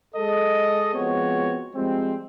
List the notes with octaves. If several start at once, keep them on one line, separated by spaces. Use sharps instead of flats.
G#3 A4 D#5
F3 G#3 B3 C4 F#4 C#5
F3 G3 G#3 C4